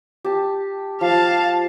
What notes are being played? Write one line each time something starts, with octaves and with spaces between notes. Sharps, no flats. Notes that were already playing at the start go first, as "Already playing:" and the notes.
G4 A5
F3 F5 A5